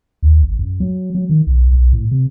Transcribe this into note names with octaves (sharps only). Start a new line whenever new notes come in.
D#2
G#1
F#2
F#3
F#3
D#3
B1
B1
A2
C3